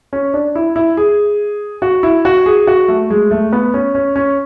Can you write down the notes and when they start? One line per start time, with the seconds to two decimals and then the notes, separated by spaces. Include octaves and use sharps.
0.13 C#4
0.34 D4
0.55 E4
0.76 E4
0.97 G#4
1.82 F#4
2.03 E4
2.25 F#4
2.46 G#4
2.67 F#4
2.88 A3
3.10 G#3
3.31 A3
3.53 B3
3.74 C#4
3.95 C#4
4.16 C#4